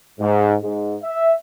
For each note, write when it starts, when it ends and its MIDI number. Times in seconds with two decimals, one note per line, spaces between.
0.20 0.55 44
0.63 0.97 44
1.03 1.33 76